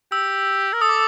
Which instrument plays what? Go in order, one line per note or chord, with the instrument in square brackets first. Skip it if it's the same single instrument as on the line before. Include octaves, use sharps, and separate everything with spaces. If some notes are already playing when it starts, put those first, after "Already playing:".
[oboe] G4 [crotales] E6
[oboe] A#4
[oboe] A4 [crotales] D#6
[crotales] D6